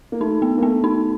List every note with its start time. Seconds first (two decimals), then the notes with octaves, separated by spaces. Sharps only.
0.12 A#3
0.20 A3 D#4
0.42 B3
0.58 A#3
0.62 A3 B3
0.84 D#4